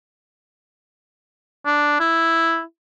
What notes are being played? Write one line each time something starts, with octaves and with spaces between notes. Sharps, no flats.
D4
E4